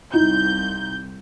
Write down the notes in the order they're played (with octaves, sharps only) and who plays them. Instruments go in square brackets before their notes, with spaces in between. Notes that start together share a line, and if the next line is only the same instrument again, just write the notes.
[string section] C2 G6 [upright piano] D#4 E4